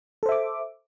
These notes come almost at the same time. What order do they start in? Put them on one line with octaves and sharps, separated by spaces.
A4 C5 E5 D6